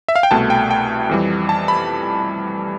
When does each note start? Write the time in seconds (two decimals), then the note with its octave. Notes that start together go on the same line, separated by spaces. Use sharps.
0.08 E5
0.16 F5
0.23 G5
0.31 C2 B2 A3 A5
0.50 G5
0.71 G5
1.09 F2 E3 G3
1.49 A5
1.68 B5